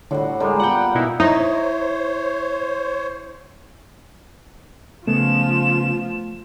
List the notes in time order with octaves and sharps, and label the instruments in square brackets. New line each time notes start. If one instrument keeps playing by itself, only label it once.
[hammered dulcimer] A2 G3 F#4 [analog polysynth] D3
[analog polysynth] D3 G#3 [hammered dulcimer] G3 A#4 G#5
[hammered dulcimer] A#2 B3 [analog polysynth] F#5 G5
[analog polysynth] B2 D#4 E4
[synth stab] D#4 [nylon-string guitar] E4 [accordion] C5 C#5
[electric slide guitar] C#3 B3 [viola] F3 F4 [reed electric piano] A3 [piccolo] E7